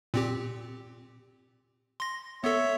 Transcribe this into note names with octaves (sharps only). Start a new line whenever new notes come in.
A#2 C4 G4
C6 A#6
B3 A4 C#5 E5